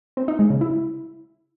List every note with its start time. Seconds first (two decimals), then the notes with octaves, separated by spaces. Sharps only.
0.17 C4
0.28 D#4
0.39 G#3
0.50 C#3
0.61 E4